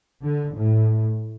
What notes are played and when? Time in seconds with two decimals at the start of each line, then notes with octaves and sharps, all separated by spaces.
0.23 D3
0.56 A2